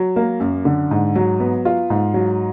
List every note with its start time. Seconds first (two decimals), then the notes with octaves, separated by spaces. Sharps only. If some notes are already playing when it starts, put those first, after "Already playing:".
Already playing: F#3
0.16 A#3
0.40 F#2
0.65 D3
0.91 G#2
1.15 F#3
1.40 B3
1.65 F4
1.90 G#2
2.14 F#3